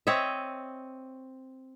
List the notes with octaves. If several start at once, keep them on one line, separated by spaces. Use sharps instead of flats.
C4 C#5 D#5 E5